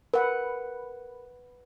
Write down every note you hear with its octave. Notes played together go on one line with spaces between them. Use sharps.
A#4 B4 F#5